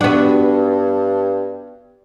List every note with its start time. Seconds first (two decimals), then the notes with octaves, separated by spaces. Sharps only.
0.01 G2 B3 D4 F#4